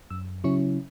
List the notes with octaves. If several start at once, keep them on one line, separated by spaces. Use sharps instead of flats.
F#2 E6
C#3 F#3 C#4 E4 C#6